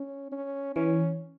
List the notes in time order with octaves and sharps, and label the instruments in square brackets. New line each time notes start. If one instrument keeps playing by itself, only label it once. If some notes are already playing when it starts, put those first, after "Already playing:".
Already playing: [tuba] C#4
C#4
[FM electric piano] E3 [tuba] C#4